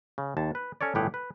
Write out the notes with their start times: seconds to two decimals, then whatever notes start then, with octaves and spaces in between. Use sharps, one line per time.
0.18 C#3
0.37 D#2 A5
0.55 B4
0.81 C#4 A4 C#5 D5
0.95 G1 A2 E3 G4 G#4 F#5
1.14 B4